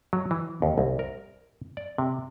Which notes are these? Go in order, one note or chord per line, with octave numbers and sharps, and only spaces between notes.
F#3
E3
D#2
C2
A#4
D5
C3